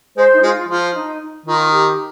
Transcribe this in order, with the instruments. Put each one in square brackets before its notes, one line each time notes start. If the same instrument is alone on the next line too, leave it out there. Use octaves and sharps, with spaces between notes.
[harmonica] G#3 [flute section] C5
[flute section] D#4
[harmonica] G#3 [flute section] F4
[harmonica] F3 [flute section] F4
[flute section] D#4
[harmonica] D#3 [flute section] F4
[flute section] G4